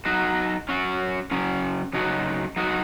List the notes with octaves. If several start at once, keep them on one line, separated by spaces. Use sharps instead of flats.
F#3 D#4 F#4
F#3 C#4 F#4
C#3 F#3 C#4
C#3 F#3 D#4 F#4
F#3 D#4 F#4